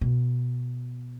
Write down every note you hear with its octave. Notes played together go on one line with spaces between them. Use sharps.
B2